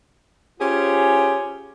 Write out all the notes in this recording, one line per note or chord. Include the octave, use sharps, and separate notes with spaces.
C#4 F4 G4 G#4 C5